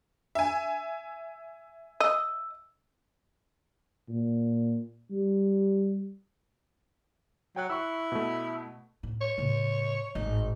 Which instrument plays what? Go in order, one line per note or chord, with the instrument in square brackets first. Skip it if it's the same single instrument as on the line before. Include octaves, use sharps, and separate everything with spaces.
[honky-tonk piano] E5 G#5
[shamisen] D#5 [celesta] E6
[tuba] A#2
G3
[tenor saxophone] F#3 [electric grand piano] G5 F#6
[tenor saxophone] E4 [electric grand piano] C#6 E6
[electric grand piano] B2 A3
[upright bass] A2 B3
[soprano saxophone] C#5
[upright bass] A2 C#3
[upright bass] G#1 A2 [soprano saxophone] D#4